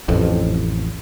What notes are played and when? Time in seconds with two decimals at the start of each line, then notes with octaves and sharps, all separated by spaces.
0.08 A1 F2